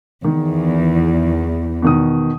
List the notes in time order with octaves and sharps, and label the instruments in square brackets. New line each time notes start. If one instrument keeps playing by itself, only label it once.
[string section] E2 [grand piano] D#3
[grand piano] B2 D#3 D#6